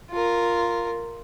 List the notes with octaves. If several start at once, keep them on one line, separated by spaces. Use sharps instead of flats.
F4 A#4